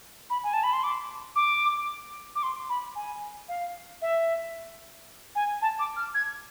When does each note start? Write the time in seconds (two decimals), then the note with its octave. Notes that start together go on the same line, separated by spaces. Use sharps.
0.30 B5
0.43 G#5
0.53 A5
0.63 B5
0.73 C6
0.83 D6
1.36 D6
2.35 D6
2.43 C6
2.69 B5
2.95 G#5
3.48 F5
4.01 E5
5.35 G#5
5.62 A5
5.79 D6
5.96 F6
6.14 G#6